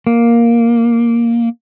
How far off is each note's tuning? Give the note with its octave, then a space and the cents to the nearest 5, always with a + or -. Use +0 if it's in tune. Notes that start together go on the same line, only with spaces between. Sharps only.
A#3 +5